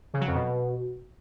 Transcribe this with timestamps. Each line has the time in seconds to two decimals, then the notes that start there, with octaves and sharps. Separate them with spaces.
0.14 C#3
0.21 F#3
0.28 F2
0.35 B2